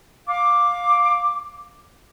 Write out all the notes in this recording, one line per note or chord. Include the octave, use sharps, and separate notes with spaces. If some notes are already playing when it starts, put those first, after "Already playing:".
F5 D6